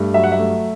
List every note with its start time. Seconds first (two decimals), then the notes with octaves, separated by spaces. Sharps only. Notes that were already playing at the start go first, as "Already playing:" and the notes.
Already playing: G2 A3
0.14 F#3 E5
0.23 F#5
0.32 E5
0.38 A3